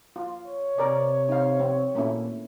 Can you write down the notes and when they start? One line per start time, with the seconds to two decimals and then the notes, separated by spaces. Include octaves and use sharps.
0.16 F4
0.46 C#5
0.78 C3 A#4 D5
1.29 D#4 F5
1.60 C4
1.95 A#2 A3 A#3 C#4 E4